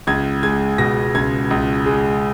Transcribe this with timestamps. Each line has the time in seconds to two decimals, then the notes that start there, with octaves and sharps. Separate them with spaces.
0.07 C#2 G#6
0.43 G#3 G#6
0.78 B2 A#6
1.15 C#2 G#6
1.51 C#2
1.86 G#3